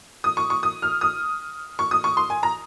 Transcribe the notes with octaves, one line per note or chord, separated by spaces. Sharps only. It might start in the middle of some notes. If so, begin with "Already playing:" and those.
D#6
C#6
C#6
D#6
F6
D#6
C#6
D#6
C#6
C6
G#5
A#5